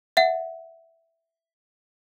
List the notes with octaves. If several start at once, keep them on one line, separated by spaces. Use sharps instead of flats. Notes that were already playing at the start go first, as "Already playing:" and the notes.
E5 F#5